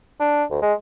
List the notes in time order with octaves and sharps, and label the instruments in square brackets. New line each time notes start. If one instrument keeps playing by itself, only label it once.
[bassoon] D4
D2
G#3